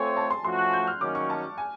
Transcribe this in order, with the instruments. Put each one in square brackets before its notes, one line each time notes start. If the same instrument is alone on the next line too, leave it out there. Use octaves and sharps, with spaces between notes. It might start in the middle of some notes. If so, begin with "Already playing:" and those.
Already playing: [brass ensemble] A3 C4 F4 A4 C#5 [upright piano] G#5
[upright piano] A5
C6
[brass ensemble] F3 A3 C#4 F#4 [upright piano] C6
[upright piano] F#6
G6
F6
[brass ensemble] D#3 F#3 A#3 C#4 [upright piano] D6
[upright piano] C#6
A5
G#5